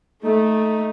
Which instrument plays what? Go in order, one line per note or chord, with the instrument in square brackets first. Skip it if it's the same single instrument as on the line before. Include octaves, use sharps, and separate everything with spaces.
[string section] A3 [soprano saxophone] D#4